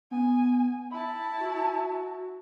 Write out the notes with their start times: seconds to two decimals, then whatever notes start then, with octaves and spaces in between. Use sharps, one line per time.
0.11 B3 G#5
0.91 E4 A5 B5
1.40 F#4